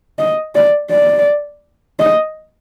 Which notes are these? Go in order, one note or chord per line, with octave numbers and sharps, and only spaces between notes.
D#5
D5
D5
D#5